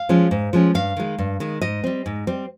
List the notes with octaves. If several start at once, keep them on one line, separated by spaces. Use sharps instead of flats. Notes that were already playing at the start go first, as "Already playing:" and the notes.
Already playing: F5
F3 G#3 C#4
G#2
F3 G#3 C#4
G2 F5
D#3 G#3
G2
D#3 G#3
G#2 D#5
G3 C4
G#2
G3 C4